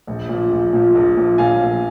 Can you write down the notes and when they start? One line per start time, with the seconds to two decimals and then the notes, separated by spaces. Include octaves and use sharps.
0.07 A#1
0.29 A#2 F3
0.51 A#1
0.73 A#2 F3
0.95 A#1
1.17 A#2 F3
1.38 A#1 F5 G#5
1.61 A#2 F3